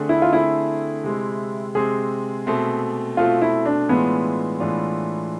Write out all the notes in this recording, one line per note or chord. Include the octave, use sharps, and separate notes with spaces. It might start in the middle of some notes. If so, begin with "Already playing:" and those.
Already playing: D3 A3 C4 G#4
E4
F4
D3 A3 C4 E4 G#4
C3 G#3 C4
C3 G#3 C4 G#4
B2 A3 C4
B2 A3 C4 F4
E4
D4
A2 E3 G#3 B3 D4 F4
A2 E3 G#3 D4 F4